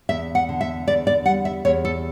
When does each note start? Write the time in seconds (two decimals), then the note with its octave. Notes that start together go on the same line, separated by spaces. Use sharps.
0.09 E2 E5
0.35 F#5
0.49 D3
0.61 E5
0.87 E2 D5
1.07 D5
1.26 G3 F#5
1.45 E5
1.65 E2 C#5
1.85 A4